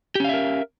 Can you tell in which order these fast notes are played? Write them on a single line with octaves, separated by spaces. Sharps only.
G4 C#4 F5 E5 A#4